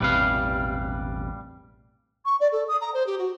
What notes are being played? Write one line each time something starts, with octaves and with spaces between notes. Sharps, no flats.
E1 A1 C3 G3 B4 F5
C#6
D5
A4
D#6
A#5
C5
G4
F#4